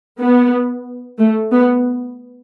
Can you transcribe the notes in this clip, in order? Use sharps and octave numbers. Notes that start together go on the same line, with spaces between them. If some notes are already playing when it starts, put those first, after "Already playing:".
B3
A3
B3